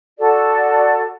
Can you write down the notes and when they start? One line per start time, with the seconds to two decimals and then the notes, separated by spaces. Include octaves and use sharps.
0.19 F#4 A4 D5